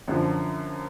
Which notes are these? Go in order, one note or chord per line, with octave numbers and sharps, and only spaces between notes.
F#2 D3 F3